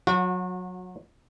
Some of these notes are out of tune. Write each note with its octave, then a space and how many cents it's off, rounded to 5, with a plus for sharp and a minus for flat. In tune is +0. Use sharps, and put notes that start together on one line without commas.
F#3 -15 F#4 -35